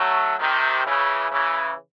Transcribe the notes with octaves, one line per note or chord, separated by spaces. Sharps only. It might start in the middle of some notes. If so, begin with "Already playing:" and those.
Already playing: F#3 A3
C3 D#3
C#3 E3
C#3 E3